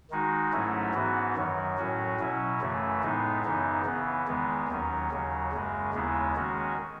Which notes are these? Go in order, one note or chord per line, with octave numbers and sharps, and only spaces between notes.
D#3 G#3 D#4 F#4
G#2 F#3 A3 C#4 E4
G#2 E3 B3 F#4
F#2 D#3 F#3
A2 F#3 C#4 F#4
B2 F#3 C#4 E4
F#2 C#3 E3 A3
A2 G#3 B3 D#4
F#2 C#3 E3 B3 D#4
C#3 E3 B3
E2 D#3 G#3 B3
D#2 D#3 F#3 C#4
D#2 C#3 F#3
F#2 C#3 G#3
D#2 C#3 G#3 B3 E4
D#3 G#3 C#4 F#4